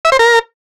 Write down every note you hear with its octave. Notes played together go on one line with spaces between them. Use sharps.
E5
C5
A#4